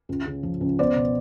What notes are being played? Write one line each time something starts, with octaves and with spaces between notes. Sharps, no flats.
C#2
C#3
F3
C#2
B3 C5 D5
B2